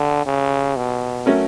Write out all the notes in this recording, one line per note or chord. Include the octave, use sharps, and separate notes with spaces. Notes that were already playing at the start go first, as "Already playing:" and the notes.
Already playing: D3 G4
C#3
B2
F#3 A3 C#4 F#4 A#4